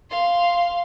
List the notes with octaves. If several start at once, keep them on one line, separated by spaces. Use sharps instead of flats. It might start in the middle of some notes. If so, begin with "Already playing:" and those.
F5 C6